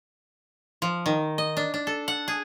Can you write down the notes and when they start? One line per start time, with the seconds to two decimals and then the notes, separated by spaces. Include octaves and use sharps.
0.82 F3
1.06 D#3
1.38 D#5
1.57 D4
1.74 D4
1.87 A4
2.08 F#5
2.28 G#4